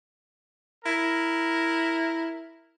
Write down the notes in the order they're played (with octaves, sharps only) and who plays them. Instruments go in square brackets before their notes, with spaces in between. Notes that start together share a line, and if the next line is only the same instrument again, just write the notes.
[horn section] E4 A#4